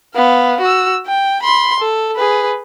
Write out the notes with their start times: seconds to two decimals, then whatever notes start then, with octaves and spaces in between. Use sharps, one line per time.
0.14 B3 F5
0.61 F#4 E6
1.06 G5
1.43 B5 C6
1.80 A4
2.16 G#4 B4